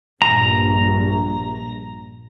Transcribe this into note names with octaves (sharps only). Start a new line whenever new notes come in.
A#1 G2 A#5